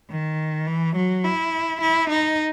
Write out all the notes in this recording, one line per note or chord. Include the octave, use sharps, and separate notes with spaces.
D#3
E3
F#3
E4
E4
D#4